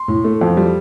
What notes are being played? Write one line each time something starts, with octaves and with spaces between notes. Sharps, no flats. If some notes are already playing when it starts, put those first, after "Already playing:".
Already playing: C6
A2
A3
F2
G3